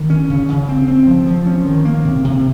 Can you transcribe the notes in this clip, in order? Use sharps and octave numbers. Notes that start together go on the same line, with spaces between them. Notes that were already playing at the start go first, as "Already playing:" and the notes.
Already playing: D#3
C#4
C#3
C#3
C4
C4
F3
F3
C#4
D#3
A#3
C3
C3